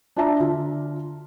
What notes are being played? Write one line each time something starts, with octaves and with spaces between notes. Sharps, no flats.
D4 F4 D5 E5 A5 A#5
D3 F4